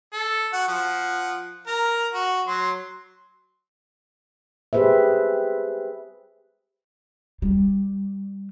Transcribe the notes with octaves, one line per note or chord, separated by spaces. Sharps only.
A4
F#4 F#5
F3 F#5
A#4 A#5
F#4
F#3 C6
G4 G#4 B4 C5 E5
G3